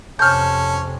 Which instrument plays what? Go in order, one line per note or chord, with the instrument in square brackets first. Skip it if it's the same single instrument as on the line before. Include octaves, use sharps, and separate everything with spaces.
[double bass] F2 C3 [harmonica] C#4 [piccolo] A5 [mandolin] F6 G6